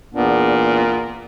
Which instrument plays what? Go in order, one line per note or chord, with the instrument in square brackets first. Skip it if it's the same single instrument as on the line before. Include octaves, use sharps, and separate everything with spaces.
[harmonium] E2 B3 D4 [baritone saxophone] A#2